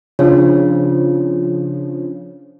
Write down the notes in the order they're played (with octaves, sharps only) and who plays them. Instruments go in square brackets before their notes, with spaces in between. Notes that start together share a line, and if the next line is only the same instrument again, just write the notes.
[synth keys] C#3 F3 [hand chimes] D4 F4 C#5